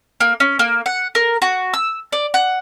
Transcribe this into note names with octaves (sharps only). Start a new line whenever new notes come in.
A#3
C#4
A#3
F#5
A#4
F#4
E6
D5
F#5